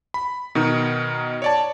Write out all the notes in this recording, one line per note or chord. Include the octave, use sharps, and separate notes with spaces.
B5
B2 D#3 D#4
C#5 D5 A5